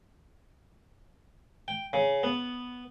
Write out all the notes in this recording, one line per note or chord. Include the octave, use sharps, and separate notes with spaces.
G5
C#3
B3